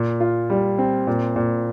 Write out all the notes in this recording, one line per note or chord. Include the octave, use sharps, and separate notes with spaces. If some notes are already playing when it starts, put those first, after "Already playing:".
Already playing: A#2
F4
G3
C4
A#2
A#2